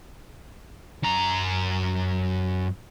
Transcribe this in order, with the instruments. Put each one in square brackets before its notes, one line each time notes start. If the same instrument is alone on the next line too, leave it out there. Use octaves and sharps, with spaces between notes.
[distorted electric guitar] F#2 A#5